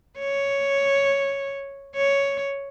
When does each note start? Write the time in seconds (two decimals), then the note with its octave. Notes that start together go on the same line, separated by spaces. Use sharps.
0.19 C#5
1.96 C#5